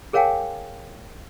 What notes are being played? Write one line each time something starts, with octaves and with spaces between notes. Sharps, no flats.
G#4 A#4 C#5 F5 G5 G#5